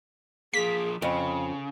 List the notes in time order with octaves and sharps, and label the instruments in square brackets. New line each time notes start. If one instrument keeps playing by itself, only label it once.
[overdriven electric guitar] F3 A#3 [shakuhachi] G#4 [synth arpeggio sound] B6
[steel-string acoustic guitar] F2 [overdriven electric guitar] C#3 [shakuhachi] B5